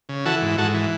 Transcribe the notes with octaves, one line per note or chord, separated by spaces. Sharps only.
C#3
E3 F#4 A4
G#2
G#2 F#4 A4
E3